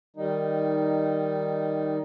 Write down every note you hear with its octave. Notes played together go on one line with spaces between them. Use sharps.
D#3 G3 D#4